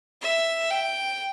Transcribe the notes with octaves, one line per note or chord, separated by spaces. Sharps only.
E5
G5